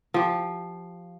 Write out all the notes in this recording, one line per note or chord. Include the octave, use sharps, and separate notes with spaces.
F3 G4